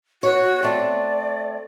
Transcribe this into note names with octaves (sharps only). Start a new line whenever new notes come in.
F#4 C#5
A3 C4 D5